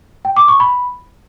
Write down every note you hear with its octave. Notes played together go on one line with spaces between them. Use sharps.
G5
D6
C#6
B5